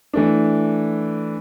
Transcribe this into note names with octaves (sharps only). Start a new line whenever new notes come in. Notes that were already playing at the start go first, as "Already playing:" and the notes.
E3 A3 D4